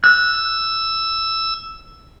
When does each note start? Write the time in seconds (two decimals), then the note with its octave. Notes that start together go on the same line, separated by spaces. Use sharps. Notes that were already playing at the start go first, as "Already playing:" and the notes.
0.04 E6 F#6